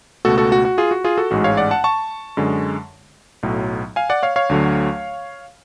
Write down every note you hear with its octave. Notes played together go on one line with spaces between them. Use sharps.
C#2 B2 A3 F#4 A4
F#4 A4
F#4
F#4
F4 G#4
F#4
F4 G#4
F#4 A4
A1 G#2 G#3 F#4
C#5 F5
D5 F#5
F#5 A5
A5 C#6
F#2 D3 G#3
B1 A2 F#3
F5 G#5
D5 F#5
C#5 F5
C#5 F5
D2 D3 F#3 A3